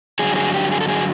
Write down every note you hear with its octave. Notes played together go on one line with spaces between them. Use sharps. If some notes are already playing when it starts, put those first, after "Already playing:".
G2 D3 F#3 G#4
G#4
G4
G#4
A4
G#4